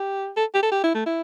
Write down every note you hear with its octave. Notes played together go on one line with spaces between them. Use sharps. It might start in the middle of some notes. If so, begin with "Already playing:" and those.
Already playing: G4
A4
G4
A4
G4
E4
A3
E4